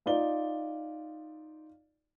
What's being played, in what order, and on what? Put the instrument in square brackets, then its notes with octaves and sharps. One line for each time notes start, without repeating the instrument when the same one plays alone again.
[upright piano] D#4 F4 D5 G7